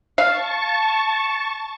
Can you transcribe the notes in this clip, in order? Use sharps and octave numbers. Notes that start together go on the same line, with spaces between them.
F5 A5 C#6